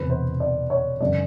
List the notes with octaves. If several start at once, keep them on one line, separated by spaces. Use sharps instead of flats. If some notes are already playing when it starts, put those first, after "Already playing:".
Already playing: E1 E2 C3 B4
C5
D5
C#5
F#2 C#3 E3 G#3 D5